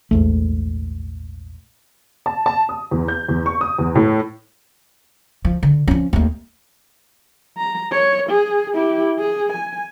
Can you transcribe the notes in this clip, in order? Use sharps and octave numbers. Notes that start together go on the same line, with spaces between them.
A#1 E2 G#2 A3
A5
A5
D#6
E2
G6
E2
C#6
D#6
E2
A2
F3
D3
F3 C#4
D#2 A3
A#5
C#5
G#4
E4 G4
G#4
G#5